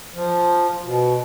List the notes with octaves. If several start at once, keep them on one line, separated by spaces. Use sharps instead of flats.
F3
B2